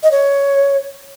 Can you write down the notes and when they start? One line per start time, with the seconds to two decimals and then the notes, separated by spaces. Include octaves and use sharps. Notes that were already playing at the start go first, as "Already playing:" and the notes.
0.03 D#5
0.11 C#5